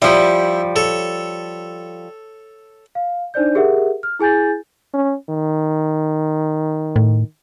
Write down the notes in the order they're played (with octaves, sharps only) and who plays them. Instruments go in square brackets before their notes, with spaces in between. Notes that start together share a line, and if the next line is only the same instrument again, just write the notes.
[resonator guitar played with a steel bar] F3 G3 [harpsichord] E4 G4
[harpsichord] A4 C#5
[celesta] F5
D4 D#4 C5 D5 G6
G4 G#4 A#4 E5 F#5
F6
E4 G#4 G#5 G6 A6
[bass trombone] C#4
D#3
[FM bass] A2